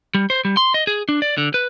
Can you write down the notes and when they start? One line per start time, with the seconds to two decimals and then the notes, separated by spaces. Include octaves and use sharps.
0.15 G3
0.30 C5
0.45 G3
0.57 C6
0.74 D#5
0.87 G#4
1.09 D4
1.22 D5
1.38 D3
1.54 B4